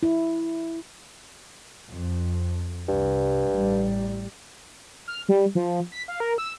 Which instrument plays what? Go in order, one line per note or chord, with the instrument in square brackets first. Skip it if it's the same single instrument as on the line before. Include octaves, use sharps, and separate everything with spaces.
[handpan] E4
[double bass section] F2
[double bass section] C2 [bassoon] G2
[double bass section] A1 G3
[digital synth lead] F6
G3
F3
B6
F5
A#4
E6